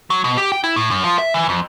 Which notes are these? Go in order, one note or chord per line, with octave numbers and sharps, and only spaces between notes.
F#3
B2
G4
G5
E4
A2
F#2
F3
E5
E3
F2